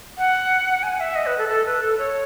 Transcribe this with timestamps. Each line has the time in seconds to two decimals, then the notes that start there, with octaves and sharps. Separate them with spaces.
0.18 F#5
0.83 G#5
1.00 E5
1.16 D#5
1.26 B4
1.38 A4
1.49 A4
1.66 B4
1.81 A4
1.98 C#5